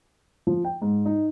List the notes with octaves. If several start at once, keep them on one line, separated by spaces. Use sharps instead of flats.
F3
G5
G#2
D#4